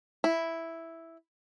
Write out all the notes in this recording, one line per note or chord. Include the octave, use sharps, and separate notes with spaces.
E4